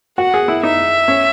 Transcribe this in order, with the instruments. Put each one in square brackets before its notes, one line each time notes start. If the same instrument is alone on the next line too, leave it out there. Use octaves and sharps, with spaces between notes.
[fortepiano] F#4 [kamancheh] F#5
[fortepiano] G#4
E4
[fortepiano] D#4 [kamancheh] E5
[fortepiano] C#4